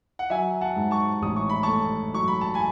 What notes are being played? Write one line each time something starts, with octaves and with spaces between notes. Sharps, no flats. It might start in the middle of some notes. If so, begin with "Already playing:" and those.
F#5
F#3 E5 G#5
F#5 A5
G#2
A5 C#6
A1 D#6
C#6
B5
A3 A5 C#6
F#3 C#6
B5
A5
G#5 B5